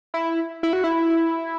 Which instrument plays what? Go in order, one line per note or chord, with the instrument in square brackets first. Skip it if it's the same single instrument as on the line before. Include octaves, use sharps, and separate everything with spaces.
[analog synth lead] E4
E4
F#4
E4